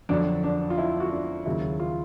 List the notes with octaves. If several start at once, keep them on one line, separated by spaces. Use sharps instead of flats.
F2 D3 F#3 D4
D4
F4
E4
F#4
D4
D#2 C#3 F#3 E4
F4